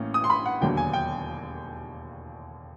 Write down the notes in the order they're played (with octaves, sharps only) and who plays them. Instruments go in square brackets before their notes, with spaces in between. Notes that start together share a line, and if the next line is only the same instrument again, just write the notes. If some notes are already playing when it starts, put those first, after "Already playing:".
Already playing: [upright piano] A1 A2 A#3 C#4
D#6
C6
B5
F#5
E1 D#2 D3 F#3 A#3 G5
G#5
G5